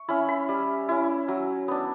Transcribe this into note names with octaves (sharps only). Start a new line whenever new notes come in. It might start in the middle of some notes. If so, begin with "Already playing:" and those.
Already playing: C#6
C#4 E4 B5
B5
G3
C#4 E4
F#3
B3 D4